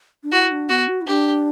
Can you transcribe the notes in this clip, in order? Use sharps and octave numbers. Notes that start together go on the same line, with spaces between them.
D4
E4 F#4
D4
B3 F#4
F#4
E4
D4 G4